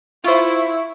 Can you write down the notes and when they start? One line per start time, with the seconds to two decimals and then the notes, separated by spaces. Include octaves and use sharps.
0.24 E4 F4 C5 C#6